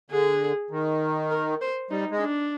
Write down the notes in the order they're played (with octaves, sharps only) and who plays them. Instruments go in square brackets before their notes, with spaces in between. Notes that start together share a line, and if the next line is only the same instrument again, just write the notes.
[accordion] D3 [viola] G#4
[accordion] D#3
[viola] A#4
C5
[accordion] G3 [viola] D#4
[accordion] G#3
[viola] D4